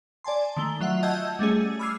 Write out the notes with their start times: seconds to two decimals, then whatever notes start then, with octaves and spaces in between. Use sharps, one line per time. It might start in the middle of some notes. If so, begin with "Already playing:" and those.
0.24 D5 G#5 A5 C6
0.57 D#3 A3 G7
0.80 F#3 F4 E5 F#5
1.03 D#5 F#5 A5 E6 G6 G#6
1.39 G3 A3 C#4 G#4
1.79 B5 D6 E6 F6 G#6 C7